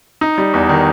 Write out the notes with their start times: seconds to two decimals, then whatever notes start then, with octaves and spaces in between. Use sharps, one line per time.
0.21 D#4
0.38 G3
0.54 E2
0.69 D#3